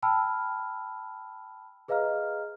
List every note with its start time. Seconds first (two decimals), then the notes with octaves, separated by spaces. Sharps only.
0.03 G5 A5 B5 E6 F6
1.88 G#4 B4 D#5 F5 A#5 F6